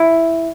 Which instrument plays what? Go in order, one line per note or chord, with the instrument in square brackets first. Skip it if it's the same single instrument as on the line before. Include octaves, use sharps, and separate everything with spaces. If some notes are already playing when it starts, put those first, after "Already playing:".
Already playing: [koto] E4